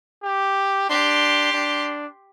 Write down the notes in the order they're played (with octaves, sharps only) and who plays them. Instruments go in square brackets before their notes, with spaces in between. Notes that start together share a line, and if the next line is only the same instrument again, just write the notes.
[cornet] G4
[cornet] D4 [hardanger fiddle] G4 C6
[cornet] D4